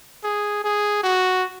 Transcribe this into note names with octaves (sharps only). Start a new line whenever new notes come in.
G#4
G#4
F#4